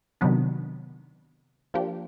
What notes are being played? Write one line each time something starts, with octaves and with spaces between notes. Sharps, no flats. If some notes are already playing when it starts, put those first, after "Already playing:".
C3 D#3 F#3 B3 D4
F3 A#3 D4 G4